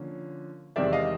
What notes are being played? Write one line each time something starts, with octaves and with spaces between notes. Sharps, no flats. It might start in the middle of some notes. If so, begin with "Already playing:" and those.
Already playing: D3 F3 A#3 C#4
E2 C3 D#3 G#3 C4 D5 E5
D#5 F5